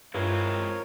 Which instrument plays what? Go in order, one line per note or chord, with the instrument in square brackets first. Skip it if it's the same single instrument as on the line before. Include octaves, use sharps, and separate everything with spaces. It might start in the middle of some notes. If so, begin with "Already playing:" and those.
[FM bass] G2 [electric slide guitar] G#3 C4 E4 [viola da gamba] F4 [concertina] A#4 C#5